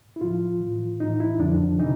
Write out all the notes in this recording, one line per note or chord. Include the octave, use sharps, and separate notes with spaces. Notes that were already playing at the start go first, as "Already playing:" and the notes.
E4
A2 F3 F4
A2 E3
A2 E3 D#4
E4
F2 D3 F3 D4
C3 E3 D#4